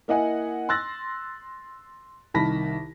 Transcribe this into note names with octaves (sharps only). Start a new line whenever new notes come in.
A#3 E4 D#5 F#5 G#5
C6 E6 F#6 A6 A#6
C2 D#3 A5 B5 A#6 B6